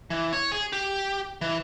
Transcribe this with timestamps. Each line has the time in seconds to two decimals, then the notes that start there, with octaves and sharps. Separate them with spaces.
0.10 E3
0.33 C#5
0.52 G#4
0.72 G4
1.41 E3